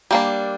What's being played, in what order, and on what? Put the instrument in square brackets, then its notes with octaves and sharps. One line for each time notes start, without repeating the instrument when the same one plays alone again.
[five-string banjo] G3 A#3 D4